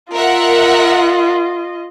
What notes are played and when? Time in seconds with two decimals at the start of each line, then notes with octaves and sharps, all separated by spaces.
0.13 F4 A#4 D#5 E5 F#5